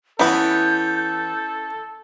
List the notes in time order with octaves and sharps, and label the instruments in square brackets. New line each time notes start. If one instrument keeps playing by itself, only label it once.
[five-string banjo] E3 B3 [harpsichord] C#4 E4 [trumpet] A4 [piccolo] G6